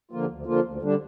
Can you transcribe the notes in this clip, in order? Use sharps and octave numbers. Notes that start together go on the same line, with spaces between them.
D3 F3 A#3 F4
D2
D3 F3 A#3 F4
D2
D3 G3 D4